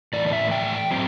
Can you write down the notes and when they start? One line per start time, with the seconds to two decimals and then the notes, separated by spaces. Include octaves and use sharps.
0.13 A2 E3 A3 D5
0.27 D5
0.33 E5
0.51 G5
0.91 F#3 C4